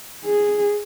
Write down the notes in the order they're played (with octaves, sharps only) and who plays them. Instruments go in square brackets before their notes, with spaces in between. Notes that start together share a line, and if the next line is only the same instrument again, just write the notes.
[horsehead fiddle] G#4